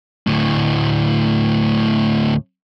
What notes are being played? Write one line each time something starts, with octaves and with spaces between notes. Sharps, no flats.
D2 A2